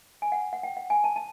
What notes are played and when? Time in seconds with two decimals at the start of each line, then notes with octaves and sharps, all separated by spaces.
0.22 G#5
0.32 F#5
0.53 F#5
0.63 G5
0.77 F#5
0.90 G#5
1.04 A5
1.16 A5